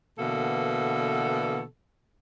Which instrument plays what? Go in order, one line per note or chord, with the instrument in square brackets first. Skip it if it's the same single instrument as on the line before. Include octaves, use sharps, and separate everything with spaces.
[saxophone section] B2 D3 E3 A#3 A4